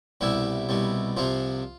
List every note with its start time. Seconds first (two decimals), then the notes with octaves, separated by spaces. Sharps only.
0.21 C2 B2 G3 E4
0.69 C2 B2 G3
1.16 C2 C3 F3 F4